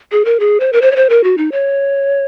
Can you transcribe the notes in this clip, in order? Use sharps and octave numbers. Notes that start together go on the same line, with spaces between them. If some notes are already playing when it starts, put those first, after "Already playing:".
G#4
A#4
G#4
C5
A#4
C5
C#5
C5
A#4
F#4
D#4
C#5